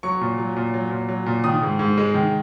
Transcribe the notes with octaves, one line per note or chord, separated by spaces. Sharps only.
F#3 C#6
A#2
F#3
A#2
F#3
A#2
F#3
A#2
D#3 D#6
G#2
G#2
G#3
D#3